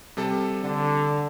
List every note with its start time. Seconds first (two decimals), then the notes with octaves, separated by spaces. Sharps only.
0.17 C3 G3 A4
0.63 D3